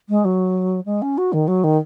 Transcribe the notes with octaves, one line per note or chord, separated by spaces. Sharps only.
G#3
F#3
G#3
C#4
F#4
D#3
F#3
D#3